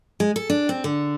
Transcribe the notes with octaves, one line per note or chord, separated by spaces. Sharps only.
G#3
A4
D4
C4
D3